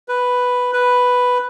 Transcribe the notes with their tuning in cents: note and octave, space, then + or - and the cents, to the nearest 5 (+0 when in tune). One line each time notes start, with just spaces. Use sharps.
B4 +0
B4 +0